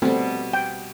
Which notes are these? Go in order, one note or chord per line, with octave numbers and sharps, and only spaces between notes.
B2 G3 A3 C4
G5